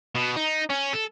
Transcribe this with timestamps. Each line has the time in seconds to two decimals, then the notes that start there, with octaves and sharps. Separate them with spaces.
0.15 B2
0.36 D#4
0.70 C#4
0.93 A4